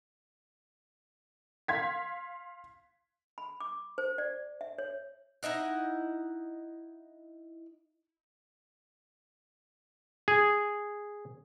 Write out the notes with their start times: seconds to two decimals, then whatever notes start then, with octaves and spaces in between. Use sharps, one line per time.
1.68 F5 C6 G#6 B6
3.38 B5
3.60 D6
3.98 C5
4.18 D5
4.61 E5
4.78 C#5
5.43 D#4 E4 D#5 F#5
10.28 G#4